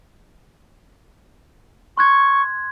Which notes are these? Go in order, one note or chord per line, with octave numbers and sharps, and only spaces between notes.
C6 C#6 F#6 G#6